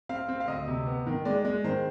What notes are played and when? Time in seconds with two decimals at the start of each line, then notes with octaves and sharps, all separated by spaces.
0.09 C4 F5
0.28 C4
0.40 F5
0.48 D2 D#5
0.68 C3
0.87 B3
1.07 D#3
1.25 G#3 D5
1.45 G#3
1.64 D#3 C5